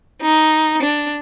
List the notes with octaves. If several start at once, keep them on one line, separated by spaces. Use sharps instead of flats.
D#4
D4